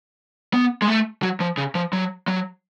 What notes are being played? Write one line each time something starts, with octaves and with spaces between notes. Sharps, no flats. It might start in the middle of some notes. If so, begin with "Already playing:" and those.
B3
G#3
A3
F#3
F3
C#3
F3
F#3
F#3